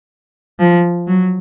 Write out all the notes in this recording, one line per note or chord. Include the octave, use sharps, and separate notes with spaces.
F3
F#3